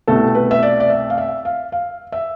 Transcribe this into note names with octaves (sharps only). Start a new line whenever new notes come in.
C2 B2 A3 A4
B4
E5
D5
D5
E5
F5
E5
F5
F5
E5